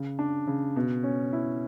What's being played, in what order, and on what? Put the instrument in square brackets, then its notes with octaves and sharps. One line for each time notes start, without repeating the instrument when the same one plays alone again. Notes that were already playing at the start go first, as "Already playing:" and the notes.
Already playing: [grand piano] C#3
D4
C#3
B2
C#4
E4